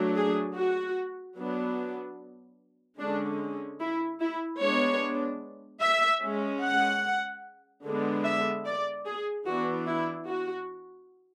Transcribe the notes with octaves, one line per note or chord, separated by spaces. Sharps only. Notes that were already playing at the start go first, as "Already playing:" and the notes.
Already playing: F#3 A3 D4
G#4
F#4
F#3 B3 D4
D3 G#3 C#4 D4
E4
E4
G#3 B3 D4 C#5
E5
G#3 C#4
F#5
D3 G#3 B3 D4
E5
D5
G#4
E3 B3 D4 F#4
E4
F#4